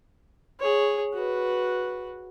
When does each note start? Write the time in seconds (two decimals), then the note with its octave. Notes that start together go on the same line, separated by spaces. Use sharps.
0.60 G#4 C#5
1.13 F#4 B4